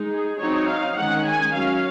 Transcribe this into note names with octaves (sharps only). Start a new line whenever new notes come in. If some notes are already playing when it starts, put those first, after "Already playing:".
Already playing: G#3 D#4
G#4
F#3 C4 D#4 C#5
F5
D#3 G#3 C#4 F#5
G#5
F#3 C#4 F5